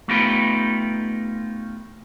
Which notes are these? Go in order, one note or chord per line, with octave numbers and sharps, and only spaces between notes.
A3 B3 D#4 F4 G4 B4